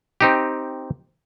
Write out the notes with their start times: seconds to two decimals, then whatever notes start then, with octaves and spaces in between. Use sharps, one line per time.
0.21 C4 D#4 G4